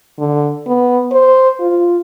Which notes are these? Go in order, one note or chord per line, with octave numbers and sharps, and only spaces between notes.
D3
B3
C5
F4